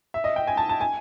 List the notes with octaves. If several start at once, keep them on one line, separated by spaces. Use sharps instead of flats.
E5
D#5
G5
G#5
A5
A5
G#5